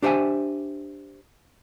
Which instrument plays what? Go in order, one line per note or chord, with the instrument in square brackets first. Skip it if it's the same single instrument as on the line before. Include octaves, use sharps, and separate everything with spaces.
[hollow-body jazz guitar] D4 G4 C5 E5 G#5